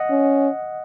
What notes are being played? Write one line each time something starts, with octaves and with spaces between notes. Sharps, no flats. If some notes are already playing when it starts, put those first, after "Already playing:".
Already playing: D#5 F#5
C#4